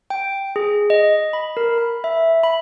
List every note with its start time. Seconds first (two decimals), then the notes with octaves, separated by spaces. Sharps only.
0.10 G5
0.56 G#4
0.90 D#5
1.33 B5
1.57 A#4
1.78 B5
2.04 E5
2.43 B5